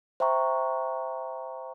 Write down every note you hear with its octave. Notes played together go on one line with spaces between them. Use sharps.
C5 E5 G5 A#5 C#6